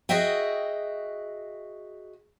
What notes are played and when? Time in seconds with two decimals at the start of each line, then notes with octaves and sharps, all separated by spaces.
0.09 F#4 G#4 D#5 E5 G5